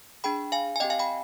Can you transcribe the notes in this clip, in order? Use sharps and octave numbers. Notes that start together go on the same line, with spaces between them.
D4 G#4 G5 B5
F5 G#5
G#5
C4 G4 D#5 G5
F5 G#5
G5 B5